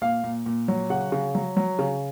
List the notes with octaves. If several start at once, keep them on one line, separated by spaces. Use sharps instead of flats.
A#2 F5
A#2
A#2
F#3
C#3 F#5
C#3
F#3
F#3
C#3